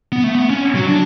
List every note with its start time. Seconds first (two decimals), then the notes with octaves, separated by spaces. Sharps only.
0.12 B3
0.24 A3
0.35 B3
0.50 C#4
0.75 F#3
0.88 D4